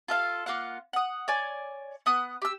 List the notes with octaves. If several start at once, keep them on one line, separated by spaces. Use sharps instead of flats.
F4 A4 F5
A#3 F4 F5 F#5
F#5 D#6
C#5 D5 G#5
B3 D#6 F#6
G4 E6